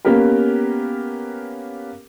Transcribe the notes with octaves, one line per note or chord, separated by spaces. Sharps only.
A#3 B3 C#4 G4 A#4 B4